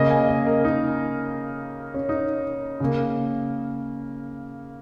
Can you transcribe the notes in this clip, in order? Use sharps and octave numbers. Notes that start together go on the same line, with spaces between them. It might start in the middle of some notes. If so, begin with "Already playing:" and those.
Already playing: C#3 A#3 D#5
G#5
D#5
A#4
D#4
C#4
D#4
C#3 A#3